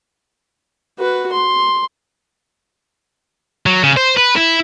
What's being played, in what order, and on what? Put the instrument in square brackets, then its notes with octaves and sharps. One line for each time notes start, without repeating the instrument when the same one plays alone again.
[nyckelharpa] F#4 B4
C6
[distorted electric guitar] F#3
C#3
C5
B4
E4